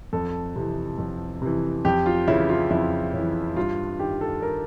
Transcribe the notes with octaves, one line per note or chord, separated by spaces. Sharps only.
F2 A4
C3 E3
F2
C3 E3
F2 G4
F4
C#3 E3 E4
F4
F2 E4
C#3 E3
G2 F4
D#3 G4
A4
A#4